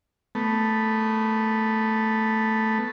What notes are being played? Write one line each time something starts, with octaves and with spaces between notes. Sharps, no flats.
A3 B3